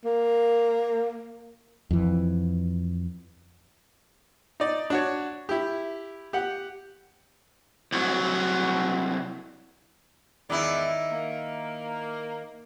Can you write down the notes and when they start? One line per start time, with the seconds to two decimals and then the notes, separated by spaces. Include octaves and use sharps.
0.05 A#3
1.91 F2 E3
4.60 D#4 D5
4.90 D4 F#4 C#5
5.49 E4 G4
6.33 G4 F#5
7.92 C2 F#3
10.50 E2 G#2 D#3 E4 D5
11.12 A#3